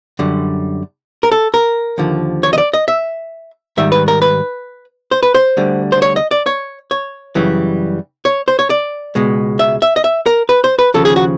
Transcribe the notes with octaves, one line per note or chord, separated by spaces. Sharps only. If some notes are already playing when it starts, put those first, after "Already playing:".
F#2 D3 G3
A#4
A4
A#4
D#2 D3 F3
C#5
D#5
D5
D#5
E5
G#2 D#3 G3 E5
B4
A#4
B4
C5
B4
C5
D2 D3 G3
C5
C#5
D#5
D5
C#5
C#5
F#2 C#3 E3 G3
C#5
C5
C#5
D5
C#2 B2 G#3
E5
E5
D#5
E5
A#4
B4
C5
B4
D#2 C#3 F3 A4
G#4
F#4